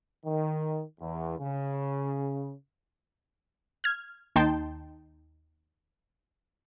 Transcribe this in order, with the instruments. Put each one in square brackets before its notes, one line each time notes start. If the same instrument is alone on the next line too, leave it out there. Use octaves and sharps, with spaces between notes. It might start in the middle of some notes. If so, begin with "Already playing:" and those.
[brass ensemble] D#3
E2
C#3
[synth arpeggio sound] F6 G#6
D#2 D#4 G5 A5 C6 G6